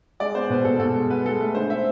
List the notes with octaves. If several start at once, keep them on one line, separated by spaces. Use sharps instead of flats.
G#3 D5
B3 C5
B2 B4
B2 A4
B2 A4
G#3
B3 B4
G#3 A4
A3 B4
D3 C5
C4 E5